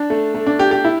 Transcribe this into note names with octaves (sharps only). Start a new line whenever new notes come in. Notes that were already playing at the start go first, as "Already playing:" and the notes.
Already playing: D4
A3
A3
D4
G4
G4
E4